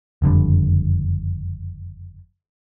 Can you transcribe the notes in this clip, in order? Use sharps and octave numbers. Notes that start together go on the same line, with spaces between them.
F#1 F2 D3 G3